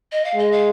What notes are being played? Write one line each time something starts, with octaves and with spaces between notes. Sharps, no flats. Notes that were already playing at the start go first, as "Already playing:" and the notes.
D#5
F5
G#3 D#5
F5